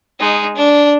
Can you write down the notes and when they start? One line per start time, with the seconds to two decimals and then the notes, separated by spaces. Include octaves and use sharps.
0.20 G#3 D#4
0.56 D4